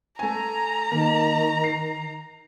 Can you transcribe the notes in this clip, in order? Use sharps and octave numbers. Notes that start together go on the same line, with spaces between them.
A3 G#5 A#5
D#3 A#3
C7